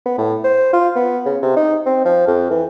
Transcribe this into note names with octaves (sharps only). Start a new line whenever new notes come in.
B3
A2
C5
F4
B3
C#3
C3
D#4
C4
F3
F2
E3